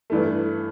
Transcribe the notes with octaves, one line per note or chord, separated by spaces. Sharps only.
G2 E3 A3